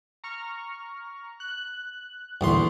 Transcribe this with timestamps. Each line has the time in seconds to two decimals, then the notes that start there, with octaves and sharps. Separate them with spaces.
0.24 A#5 C#6 F6
1.40 F#6
2.41 B1 E2 G2 A#2 D3 C6